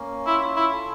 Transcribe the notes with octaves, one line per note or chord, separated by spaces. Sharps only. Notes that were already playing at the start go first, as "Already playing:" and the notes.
Already playing: A#3 C#4
E4 F4
E4
A4